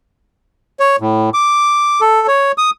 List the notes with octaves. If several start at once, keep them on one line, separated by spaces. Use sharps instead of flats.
C#5
A2
D6
A4
C#5
D#6